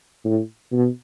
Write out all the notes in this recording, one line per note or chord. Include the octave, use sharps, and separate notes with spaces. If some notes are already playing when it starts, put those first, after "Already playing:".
A2
B2